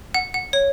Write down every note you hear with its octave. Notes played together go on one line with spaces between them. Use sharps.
F#5
F#5
C#5